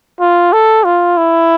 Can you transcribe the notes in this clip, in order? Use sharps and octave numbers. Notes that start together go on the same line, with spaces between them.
F4
A4
F4
E4